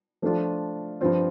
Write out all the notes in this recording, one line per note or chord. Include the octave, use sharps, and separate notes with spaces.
F3 A3 D4 F4
G2 F3 C4 F4